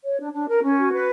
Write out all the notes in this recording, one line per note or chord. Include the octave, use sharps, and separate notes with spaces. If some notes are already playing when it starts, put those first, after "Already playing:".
C#5
D4
D4
A#4
C#4
F#4
B4